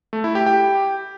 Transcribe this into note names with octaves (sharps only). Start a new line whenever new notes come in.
A3
E4
G4
G4